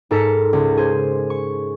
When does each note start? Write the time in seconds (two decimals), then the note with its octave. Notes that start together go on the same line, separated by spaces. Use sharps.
0.11 G#2 A4 A#4 B6 C#7
0.53 C#2
0.77 G#4 C5
1.30 C#6